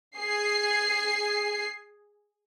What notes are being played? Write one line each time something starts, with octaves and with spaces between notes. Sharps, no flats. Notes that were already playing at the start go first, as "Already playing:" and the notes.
G#4 C7